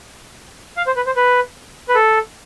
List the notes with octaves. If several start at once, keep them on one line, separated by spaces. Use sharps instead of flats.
F5
C5
B4
C5
B4
B4
A4